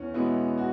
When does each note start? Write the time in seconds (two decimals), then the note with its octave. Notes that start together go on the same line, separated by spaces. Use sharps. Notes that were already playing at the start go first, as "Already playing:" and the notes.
Already playing: E2 C#4
0.14 B2 G#3 B3 E4
0.58 F#4